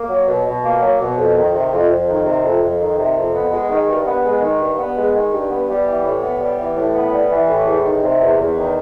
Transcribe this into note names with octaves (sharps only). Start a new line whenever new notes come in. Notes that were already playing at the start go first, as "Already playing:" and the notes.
Already playing: A#3
F#3
B2
B2
A#3
F#3
B2
F2
D#3
C3
F2
F2
D#3
C3
F2
F2
D#3
C3
F2
B3
G#3
D#3
G2
B3
G#3
D#3
G2
B3
G#3
D#3
G2
B3
G3
E3
A2
B3
G3
E3
A2
B3
G3
E3
A2
E2
D#3
C3
E2
E2
D#3